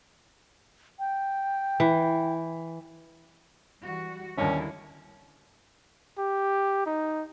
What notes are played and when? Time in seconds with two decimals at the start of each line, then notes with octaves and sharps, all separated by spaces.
0.99 G5
1.80 E3
3.83 E3 G3 F#4
4.38 G#1 D#2 D3 G3 C#4 E4
6.18 G4
6.86 D#4